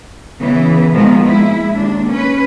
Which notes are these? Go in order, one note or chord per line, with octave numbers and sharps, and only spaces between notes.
C#3 E3 B3
B2 D#3 F3 G#3 A#3 B3
G#3 E4
D#2 D4
C#4 B4